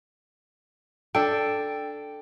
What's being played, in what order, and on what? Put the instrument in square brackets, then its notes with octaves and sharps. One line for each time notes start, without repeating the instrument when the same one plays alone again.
[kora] D4 A4 [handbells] G5